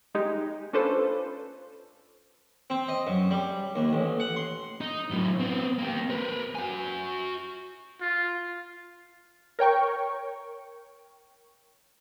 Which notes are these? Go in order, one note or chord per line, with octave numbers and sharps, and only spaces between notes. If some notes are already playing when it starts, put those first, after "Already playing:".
G#3 D#4 G4
C#4 D4 F4 A4 B4 C5
C4
D#5
F#2
G3
D#2
A1
F#5
C6
D#4
A2 F#3
B3 C4
A#3 G4
A#4 B4
F#4 G#5
F4
A#4 C#5 G5 C#6